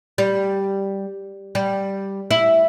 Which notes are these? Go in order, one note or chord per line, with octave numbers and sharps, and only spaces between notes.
G3
G3
E4